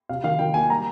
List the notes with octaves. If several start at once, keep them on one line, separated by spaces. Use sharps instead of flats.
C3 F5
D#3 F5
D#3 G5
A#3 G#5
G3 A#5